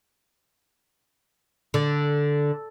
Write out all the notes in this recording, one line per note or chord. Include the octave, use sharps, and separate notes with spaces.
D3